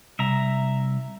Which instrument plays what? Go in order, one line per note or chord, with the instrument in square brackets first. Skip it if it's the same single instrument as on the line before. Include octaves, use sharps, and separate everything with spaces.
[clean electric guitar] C2 [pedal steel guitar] E5 A#5